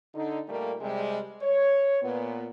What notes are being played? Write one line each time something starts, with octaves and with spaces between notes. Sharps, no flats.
D3 D#4
A#2 G3 A3 A#3
C3 G3 G#3
C#5
A#2 B3